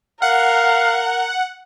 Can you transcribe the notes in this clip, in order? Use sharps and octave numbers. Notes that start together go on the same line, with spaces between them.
A#4 F5 F#5